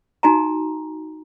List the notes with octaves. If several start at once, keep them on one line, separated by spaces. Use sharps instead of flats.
D#4 F#4 G#5 A#5